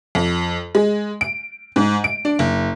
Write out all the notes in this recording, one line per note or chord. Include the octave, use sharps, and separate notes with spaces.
F2
G#3
D7
G#2
D7
D4
F#1